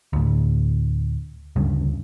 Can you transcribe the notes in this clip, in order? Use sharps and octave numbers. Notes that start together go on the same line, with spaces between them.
D2 A2
D2 G2 C#3